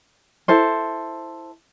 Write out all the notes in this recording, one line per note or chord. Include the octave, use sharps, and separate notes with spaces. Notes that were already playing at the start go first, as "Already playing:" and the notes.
E4 A4 C5